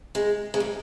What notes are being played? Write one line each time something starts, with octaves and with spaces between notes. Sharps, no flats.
G#3
G#3
G3